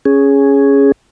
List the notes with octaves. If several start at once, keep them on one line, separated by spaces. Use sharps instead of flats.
C#4 G#4